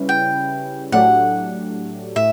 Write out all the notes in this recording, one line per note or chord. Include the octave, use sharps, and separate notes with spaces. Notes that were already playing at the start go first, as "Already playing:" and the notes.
Already playing: C#3 G3 C#4 E4 B4
G5
A2 F#3 A3 D4 G4 F#5
A2 E5